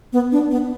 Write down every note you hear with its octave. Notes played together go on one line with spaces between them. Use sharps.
B3
D4
B3